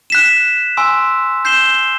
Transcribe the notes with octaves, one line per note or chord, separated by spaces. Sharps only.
F#6 B6 E7
G#5 C6 E6
G6 C7 E7 G7